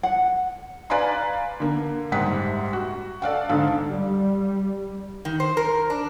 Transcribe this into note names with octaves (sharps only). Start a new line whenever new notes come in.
F#5
B4 D5 F5 G#5 A#5 C6
D3 A#3
F#1 G#2 G3 F#5 B6
F#4
A4 D5 F5 F#5
G#2 D3 A4 F5
G3
D#3
C5
A#4
D4